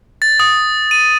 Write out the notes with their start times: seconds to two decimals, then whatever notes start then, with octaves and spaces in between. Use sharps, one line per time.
0.22 A6
0.40 D#6
0.91 D#7